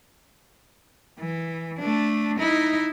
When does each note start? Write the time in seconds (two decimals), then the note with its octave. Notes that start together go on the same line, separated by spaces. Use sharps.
1.19 E3
1.79 A3 D4
2.38 D#4 E4